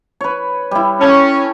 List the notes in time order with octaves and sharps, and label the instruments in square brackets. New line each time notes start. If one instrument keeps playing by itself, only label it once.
[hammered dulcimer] B4 C#5
G3 E4
[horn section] C#4 [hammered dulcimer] A4 G5